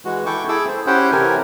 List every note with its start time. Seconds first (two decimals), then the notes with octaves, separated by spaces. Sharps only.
0.05 E3 G#3 F#4
0.26 E4 A4 G5 C#6 D6
0.49 E4 G#4 A4 D6 E6
0.68 C5
0.87 C#4 E4 G4 C5 F#5 G5
1.12 C3 E3 G4 A4 A#4 G#5